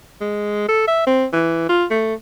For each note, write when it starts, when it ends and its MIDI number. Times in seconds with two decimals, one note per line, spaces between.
0.21 0.64 56
0.69 0.86 69
0.88 1.04 76
1.07 1.25 60
1.33 1.68 52
1.69 1.85 65
1.91 2.14 57